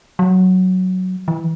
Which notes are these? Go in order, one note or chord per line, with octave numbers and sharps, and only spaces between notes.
F#3
E3